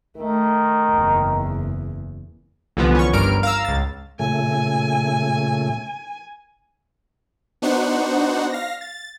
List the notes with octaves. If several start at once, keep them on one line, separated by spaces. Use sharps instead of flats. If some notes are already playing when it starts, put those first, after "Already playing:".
D#3 A3
F#1 E2
C2 D3 E3 F3 B3
C#4 C#6
G1 G2 A#4 F6 D7
F5 A#5 E6
C#2 A6
A#2 C#3 A3 G#5
B3 D4 D#4 F#4 C5 F#5
F5 A#6
A6